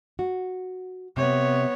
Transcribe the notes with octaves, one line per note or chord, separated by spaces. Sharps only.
F#4
C3 B3 C#5